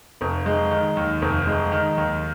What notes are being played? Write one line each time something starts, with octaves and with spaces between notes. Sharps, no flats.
F1
G#3
D#3
D#2
F1
G#3
D#3
D#2